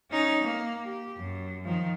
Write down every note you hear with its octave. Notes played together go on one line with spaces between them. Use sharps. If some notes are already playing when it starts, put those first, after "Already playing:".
C#4 D#4
A#3
G4
F#2
D#3 F3